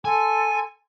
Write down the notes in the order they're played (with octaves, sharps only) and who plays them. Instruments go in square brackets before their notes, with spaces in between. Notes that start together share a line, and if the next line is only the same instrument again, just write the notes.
[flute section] A4 C6 [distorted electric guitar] G#5